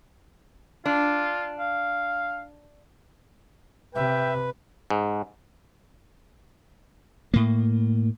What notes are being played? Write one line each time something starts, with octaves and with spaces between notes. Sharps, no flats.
D4 F4
F5
C3 B4 E5 G5
G#2
A2 A#3